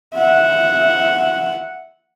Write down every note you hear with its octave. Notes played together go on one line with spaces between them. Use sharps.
E5 F#5